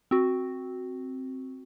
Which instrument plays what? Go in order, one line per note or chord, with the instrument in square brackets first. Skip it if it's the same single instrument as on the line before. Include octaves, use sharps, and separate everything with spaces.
[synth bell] C4 F#4